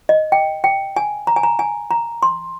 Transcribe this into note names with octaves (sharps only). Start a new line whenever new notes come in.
D#5
G5
G5
G#5
A#5
G#5
A#5
G#5
A#5
C6